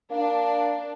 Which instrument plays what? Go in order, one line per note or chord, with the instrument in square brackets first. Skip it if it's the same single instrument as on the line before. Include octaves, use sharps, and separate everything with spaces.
[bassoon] A#3 [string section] D4